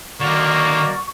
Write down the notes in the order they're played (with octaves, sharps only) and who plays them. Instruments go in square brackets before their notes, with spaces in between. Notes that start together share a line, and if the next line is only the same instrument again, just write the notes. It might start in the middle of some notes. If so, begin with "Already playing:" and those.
[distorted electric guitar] D3 D#3 [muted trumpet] A#3 [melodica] F#4 D5 [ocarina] C#6